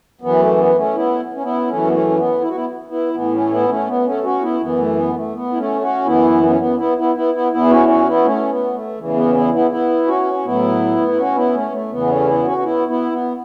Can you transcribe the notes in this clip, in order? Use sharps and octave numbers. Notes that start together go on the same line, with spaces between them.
F#2 E3 B3
A3
B3
A3 C#4
B3 E4
C#4
B3 E4
F#2 E3 A3 C#4
B3
A3 C#4
C#4
B3
E4
F#4
B3 E4
B3 E4
A2 E3 B3
A3 C#4
B3 E4
A3 C#4
B3
A3 C#4
C#4 F#4
B3 E4
F#2 E3 B3
A3
B3
A3
B3
E4
A3 C#4
C#4 F#4
F#2 E3 B3 E4
B3
C#4
B3
B3 E4
B3 E4
B3 E4
B3 E4
E2 E3 B3 E4
C#4 F#4
C#4 F#4
B3 E4
A3 C#4
B3
A3
E2 C#3 E3
B3
C#4
B3 E4
B3 E4
B3 E4
C#4 F#4
C#4
A2 F#3 B3 E4
E4
C#4 F#4
B3 E4
A3 C#4
A3
E2 C#3 E3 B3
A3 C#4
B3 E4
C#4 F#4
C#4
B3 E4
B3 E4
B3